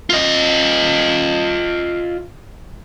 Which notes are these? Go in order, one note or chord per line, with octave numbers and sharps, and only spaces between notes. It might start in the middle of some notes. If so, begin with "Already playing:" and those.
F4 D#5